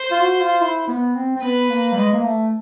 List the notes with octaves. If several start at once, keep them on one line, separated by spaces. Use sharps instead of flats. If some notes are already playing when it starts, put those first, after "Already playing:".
Already playing: C5
F4
F#4
F4
E4
B3
C4
C4
B3 B4
A#3
G3
G#3
A#3
A3